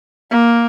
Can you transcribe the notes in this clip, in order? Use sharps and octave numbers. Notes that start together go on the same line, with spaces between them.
A#3